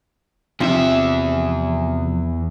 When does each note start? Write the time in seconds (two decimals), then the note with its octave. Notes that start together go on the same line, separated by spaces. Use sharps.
0.60 E2 C3 F3 E5